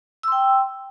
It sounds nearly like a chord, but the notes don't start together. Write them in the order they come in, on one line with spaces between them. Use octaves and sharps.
E6 C6 G5